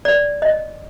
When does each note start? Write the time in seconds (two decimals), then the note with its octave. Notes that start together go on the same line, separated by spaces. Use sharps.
0.05 D5
0.42 D#5